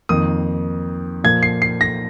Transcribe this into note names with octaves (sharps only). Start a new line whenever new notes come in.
F2 D#3 A#3 D#6
A#2 F3 A#3 G#6
C7
C7
A#6